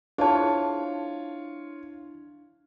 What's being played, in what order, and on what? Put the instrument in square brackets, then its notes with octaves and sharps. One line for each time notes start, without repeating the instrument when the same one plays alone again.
[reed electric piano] D4 E4 [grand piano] F4 C#5 [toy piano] G#4 C5 A5